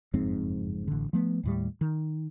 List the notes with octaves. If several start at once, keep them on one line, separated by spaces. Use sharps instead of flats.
F#1 F2 G#2 C4
A1 D3
F3 A3 B3
D#2 A2 G3
D#3